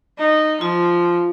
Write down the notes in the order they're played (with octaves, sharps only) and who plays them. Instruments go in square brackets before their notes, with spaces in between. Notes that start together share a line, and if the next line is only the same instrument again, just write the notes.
[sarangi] D#4
[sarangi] F3 [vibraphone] F4